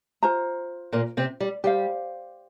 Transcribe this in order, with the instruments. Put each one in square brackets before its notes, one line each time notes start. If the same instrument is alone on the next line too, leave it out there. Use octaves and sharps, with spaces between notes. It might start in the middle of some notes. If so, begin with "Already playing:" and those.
[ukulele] F4 C5 A#5
[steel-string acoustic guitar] A#2 A#3
C3 C4
G3
[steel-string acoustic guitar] G3 [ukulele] G4 C5 F5